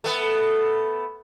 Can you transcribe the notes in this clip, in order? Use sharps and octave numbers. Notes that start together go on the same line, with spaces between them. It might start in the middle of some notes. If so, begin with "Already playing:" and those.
A3 B3